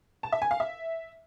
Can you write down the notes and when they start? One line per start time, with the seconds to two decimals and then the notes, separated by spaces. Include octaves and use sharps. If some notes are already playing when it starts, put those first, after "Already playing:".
0.23 A5
0.32 E5
0.42 G#5
0.51 F5
0.60 E5